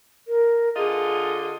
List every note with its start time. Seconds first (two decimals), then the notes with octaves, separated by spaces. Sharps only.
0.28 A#4
0.77 D3 F4 G#4 D#5